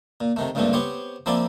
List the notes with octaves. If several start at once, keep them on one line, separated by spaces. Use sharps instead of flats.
A#2
C3 D#3 A3
C#2 G2 A#2 D3 A3 C4
B3 C4 G4 C5 C#5
F3 A#3 C4 E4 D5